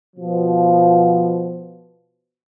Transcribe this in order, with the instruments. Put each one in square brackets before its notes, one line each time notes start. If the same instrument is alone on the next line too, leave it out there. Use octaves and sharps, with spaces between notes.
[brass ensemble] B2 F3